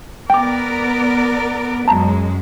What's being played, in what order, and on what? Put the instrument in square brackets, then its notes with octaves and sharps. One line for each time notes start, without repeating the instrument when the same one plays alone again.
[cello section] B3 A#4 D5 [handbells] G5 D6
[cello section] F#2 G#3 [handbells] A5 A#5